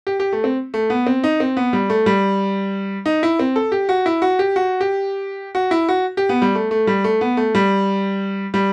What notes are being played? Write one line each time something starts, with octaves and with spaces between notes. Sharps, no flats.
G4
G4
A3
C4
A3
B3
C4
D#4
C4
B3
G3
A3
G3
D#4
E4
C4
A4
G4
F#4
E4
F#4
G4
F#4
G4
F#4
E4
F#4
G4
B3
G3
A3
A3
G3
A3
B3
A3
G3
G3